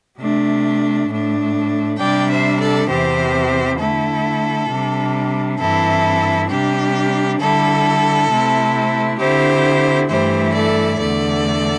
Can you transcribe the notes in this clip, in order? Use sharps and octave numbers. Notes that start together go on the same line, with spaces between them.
C3 A3 D4
A2 A3 D4
C3 G3 D4 D5 G5
C5 E5
A4 D5
E2 C3 E3 C4 G4 C5
D3 A3 E4 A4
C3 G3 D4
G2 E3 C4 E4 A4
C3 G3 D4 G4
D3 G3 E4 A4
C3 A3 C4 E4
D3 C4 E4 G4 C5
G2 E3 A3 E4 G4 C5
A4 D5
E2 D3 A3 A4 D5